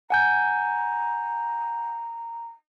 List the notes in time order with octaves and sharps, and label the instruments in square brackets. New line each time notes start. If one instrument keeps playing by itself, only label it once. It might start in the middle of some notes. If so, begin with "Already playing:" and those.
[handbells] F#5 G#5 G6 [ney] A#5